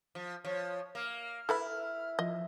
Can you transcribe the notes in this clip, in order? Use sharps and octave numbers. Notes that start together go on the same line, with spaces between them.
F3
F3 C#5
A#3 F6
E4 A4 B4 B5
F3 D#5